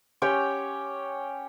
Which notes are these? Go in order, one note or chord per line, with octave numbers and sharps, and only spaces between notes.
C#4 G4 C#5 G5